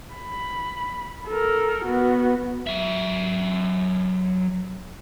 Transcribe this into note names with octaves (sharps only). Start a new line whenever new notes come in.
B5
A4 A#4
B3 F#4
F#3 E5